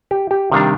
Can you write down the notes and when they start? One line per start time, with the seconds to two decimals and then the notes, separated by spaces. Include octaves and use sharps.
0.11 G4
0.31 G4
0.51 C3 D#3 G3 D4 F5